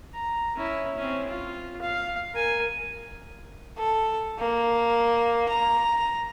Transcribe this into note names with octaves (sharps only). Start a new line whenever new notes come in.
A#5
C#4 E4
C4 C#4
F4
F5
A#4 G#5
A4
A#3
A#5